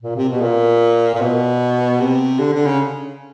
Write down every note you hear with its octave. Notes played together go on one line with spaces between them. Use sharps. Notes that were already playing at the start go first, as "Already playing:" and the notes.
A#2
C3
B2
A#2
A#2
B2
C3
D3
D3
C#3